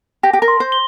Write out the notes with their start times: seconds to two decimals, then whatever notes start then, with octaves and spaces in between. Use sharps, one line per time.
0.23 G4 A#6
0.33 G4
0.42 A#4
0.48 C6
0.60 C5
0.72 G7